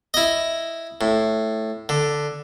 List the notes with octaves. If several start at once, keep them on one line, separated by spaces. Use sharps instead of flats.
E4 D#5
A2
D3